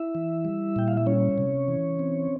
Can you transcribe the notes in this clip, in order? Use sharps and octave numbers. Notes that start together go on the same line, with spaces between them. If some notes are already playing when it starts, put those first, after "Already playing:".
Already playing: E4 E5
E3
G3
A#2 G5
F5
E5
G3 C#4 C#5
C3
E3
C4